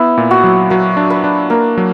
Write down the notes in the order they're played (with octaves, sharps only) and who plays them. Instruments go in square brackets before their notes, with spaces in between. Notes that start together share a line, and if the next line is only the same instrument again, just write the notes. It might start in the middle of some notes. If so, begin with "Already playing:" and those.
Already playing: [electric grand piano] B3 [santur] E4
[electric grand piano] A#2
[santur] F#4
[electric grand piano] F#3
[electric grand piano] F#3 [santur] B4
[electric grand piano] D4
[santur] B4
[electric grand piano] D4
[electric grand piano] A#3 [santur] A#4
[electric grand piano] F#3